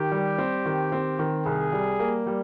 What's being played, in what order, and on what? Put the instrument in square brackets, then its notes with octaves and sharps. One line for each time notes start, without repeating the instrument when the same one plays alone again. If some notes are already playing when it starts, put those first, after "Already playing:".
Already playing: [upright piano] D#3 [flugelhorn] G4
[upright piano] G3
C4
D#3
C4
D#3
[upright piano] C2 [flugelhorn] G#4
[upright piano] G3
A#3
G3